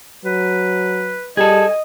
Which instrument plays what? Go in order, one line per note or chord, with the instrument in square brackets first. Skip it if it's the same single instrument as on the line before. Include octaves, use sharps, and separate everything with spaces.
[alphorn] F#3 [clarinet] B4
[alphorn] G3 [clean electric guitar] G#4 A4 [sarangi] D#5